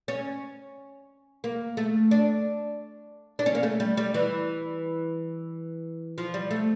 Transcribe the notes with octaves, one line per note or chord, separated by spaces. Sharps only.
C#4
A#3
A3
D4
D4
C#4
A#3
A3
G3
G3
E3
F3
G3
A3